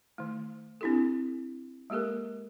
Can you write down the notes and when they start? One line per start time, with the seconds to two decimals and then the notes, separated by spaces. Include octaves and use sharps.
0.18 D#3 A3
0.81 C4 D4 E4 G4 A4
1.90 G#3 A#3 G4 A4 A#4